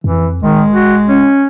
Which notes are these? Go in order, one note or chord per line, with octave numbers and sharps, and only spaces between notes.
F2 E3
D1 D#3 G#3
F#4
C#4